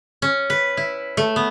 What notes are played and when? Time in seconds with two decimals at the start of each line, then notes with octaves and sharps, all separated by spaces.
0.22 C#4
0.50 B4
0.77 E4
1.17 A3
1.36 B3